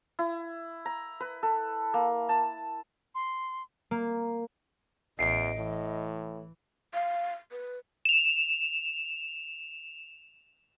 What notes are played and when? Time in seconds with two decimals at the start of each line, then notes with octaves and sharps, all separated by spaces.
0.19 E4
0.86 A#5
1.20 B4
1.43 A4
1.94 A#3
2.29 A5
3.15 C6
3.91 A#3
5.19 A1 E2 D#5 C7 D7
5.57 A2 E3
6.94 F5
7.51 B4
8.05 E7 F7